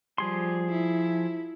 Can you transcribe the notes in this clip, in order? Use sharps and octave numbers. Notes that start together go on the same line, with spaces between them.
F3 G3 G#4 C6
E4